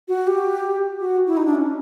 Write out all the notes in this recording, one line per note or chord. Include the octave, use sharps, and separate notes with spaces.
F#4
G4
F#4
E4
D#4
D4
C#4